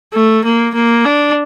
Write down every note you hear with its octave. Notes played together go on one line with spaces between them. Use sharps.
A3
A#3
A#3
D4